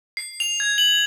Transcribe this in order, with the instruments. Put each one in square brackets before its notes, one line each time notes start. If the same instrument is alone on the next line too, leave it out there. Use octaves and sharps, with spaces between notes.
[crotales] C7
F7
G#6
F#7